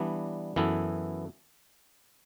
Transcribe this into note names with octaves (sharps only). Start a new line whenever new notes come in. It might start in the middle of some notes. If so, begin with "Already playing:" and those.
Already playing: E3 G3 B3 D4
F#2 E3 B3 E4 A4